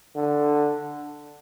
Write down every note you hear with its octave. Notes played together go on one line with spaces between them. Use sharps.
D3